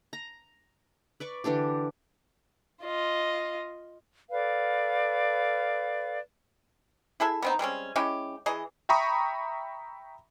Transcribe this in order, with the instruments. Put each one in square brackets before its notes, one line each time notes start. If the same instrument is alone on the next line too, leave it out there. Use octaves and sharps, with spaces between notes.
[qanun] A#5
B4 D5 C#6
D3 E3 D4 G4
[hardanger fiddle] F4 D#5
[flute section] A4 B4 D5 F5
[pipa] E4 G#4 A4 E5
B3 C4 D#4
G3 G#3 C4 C#4
G#3 C#4 E4 G4
E3 G#4 D#5
[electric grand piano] E5 G5 A#5 B5 C#6 D#6